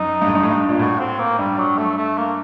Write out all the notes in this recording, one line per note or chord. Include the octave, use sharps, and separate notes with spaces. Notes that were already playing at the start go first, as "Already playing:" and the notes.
Already playing: F#2 D#4
G2
A2
G2
A2
G2
A#2
A2 F#4
C4
A#3
G2 G3
F#3
A3
A3
A#3